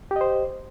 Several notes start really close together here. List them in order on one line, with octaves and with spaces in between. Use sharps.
G4 D#5 C5